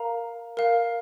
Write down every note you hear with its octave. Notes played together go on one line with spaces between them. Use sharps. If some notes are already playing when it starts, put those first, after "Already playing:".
Already playing: A#4 F5 A#5
A#4 F5